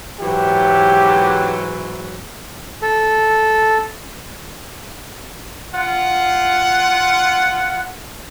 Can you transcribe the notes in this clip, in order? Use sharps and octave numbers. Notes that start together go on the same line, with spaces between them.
G#2 E3 F#3 G4
A4
F4 F#5